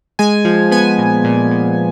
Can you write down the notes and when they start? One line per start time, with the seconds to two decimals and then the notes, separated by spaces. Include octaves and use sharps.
0.19 G#3 G#5
0.45 F3
0.71 B3 G#5
0.98 A#2
1.24 A#2
1.51 A#2